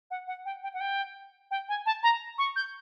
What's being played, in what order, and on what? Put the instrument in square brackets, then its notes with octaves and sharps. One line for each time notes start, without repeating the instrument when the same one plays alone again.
[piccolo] F#5
F#5
G5
G5
F#5
G5
G5
G#5
A5
A#5
C#6
G6